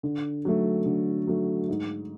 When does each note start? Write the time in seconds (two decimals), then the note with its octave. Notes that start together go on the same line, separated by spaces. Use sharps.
0.03 D3
0.45 F#3 A3
0.86 D3
1.28 F#3 A3
1.69 G#2